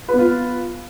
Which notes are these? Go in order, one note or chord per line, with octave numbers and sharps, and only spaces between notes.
B3 F4 B4